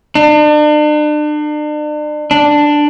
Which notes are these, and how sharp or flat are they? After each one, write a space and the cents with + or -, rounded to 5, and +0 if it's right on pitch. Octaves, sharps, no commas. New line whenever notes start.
D4 +40
D4 +5